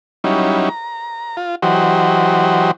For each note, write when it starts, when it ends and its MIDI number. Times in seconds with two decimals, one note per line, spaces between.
0.24 0.69 54
0.24 0.69 55
0.24 0.69 61
0.24 0.69 63
0.24 0.69 64
0.69 1.36 82
1.37 1.55 65
1.62 2.71 52
1.62 2.71 54
1.62 2.71 66
1.62 2.71 67
1.62 2.71 72
1.62 2.71 75